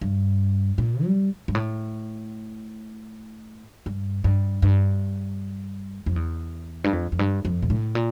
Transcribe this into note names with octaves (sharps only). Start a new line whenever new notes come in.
G2
A#2
G3
G2
A2
G2
G2
G2
F2
E2
G2
F2
F2
G2
F2
A#2
A2
A#2